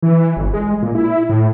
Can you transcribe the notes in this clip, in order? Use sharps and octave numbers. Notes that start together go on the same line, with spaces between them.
E3
G1
G#3
A#2
E4
A2